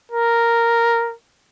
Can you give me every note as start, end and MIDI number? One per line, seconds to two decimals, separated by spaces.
0.12 1.14 70